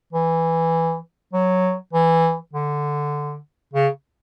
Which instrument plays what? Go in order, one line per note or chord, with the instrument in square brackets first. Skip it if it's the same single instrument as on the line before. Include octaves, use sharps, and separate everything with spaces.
[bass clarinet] E3
F#3
E3
D3
C#3